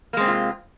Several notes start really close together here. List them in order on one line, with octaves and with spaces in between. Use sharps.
A#3 G#3 C4 C3 F4